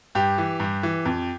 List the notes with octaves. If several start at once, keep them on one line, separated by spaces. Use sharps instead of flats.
G2 G4
E3
G2
E3
F2